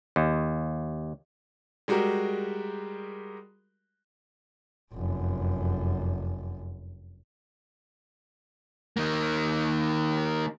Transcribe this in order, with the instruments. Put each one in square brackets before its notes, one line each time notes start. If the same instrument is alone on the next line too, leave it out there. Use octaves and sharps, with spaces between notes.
[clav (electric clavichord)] D#2
[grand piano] G3 G#3 F#4 G4 A#4
[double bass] F1 F#2
[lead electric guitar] D#3 A#3